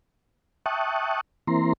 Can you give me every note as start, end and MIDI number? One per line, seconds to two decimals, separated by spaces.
0.66 1.21 76
0.66 1.21 79
0.66 1.21 81
0.66 1.21 85
0.66 1.21 87
0.66 1.21 90
1.47 1.73 52
1.47 1.73 58
1.47 1.73 60
1.47 1.73 64
1.47 1.73 82
1.47 1.73 84